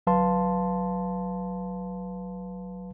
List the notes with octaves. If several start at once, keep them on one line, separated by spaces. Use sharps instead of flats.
G1 F#3 B4 F5 A5 C6